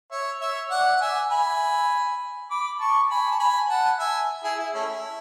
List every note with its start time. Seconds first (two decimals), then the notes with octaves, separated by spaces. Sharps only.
0.11 C#5 E5
0.41 C#5 E5
0.70 D5 F#5
0.96 F#5
1.01 E5 G#5
1.30 G#5 B5
2.50 B5 D6
2.80 A5 C#6
3.10 G#5 B5
3.31 A5
3.39 G#5 B5
3.70 F#5 A5
4.00 E5 G#5
4.44 E4 G#4
4.59 E4
4.75 A3 C#4 E4